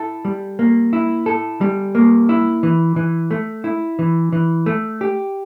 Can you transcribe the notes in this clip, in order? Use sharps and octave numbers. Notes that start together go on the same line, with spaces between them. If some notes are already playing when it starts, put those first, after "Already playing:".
Already playing: E4 A4
G3
A#3
E4
A4
G3
A#3
E4
E3
E3
A3
E4
E3
E3
A3
G4